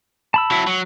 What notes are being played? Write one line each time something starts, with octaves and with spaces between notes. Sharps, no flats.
A5 B5 E6
F#3 E4
F#3